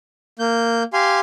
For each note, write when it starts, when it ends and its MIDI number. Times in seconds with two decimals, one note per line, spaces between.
0.39 0.83 58
0.39 0.83 91
0.93 1.20 67
0.93 1.20 77
0.93 1.20 80
0.93 1.20 84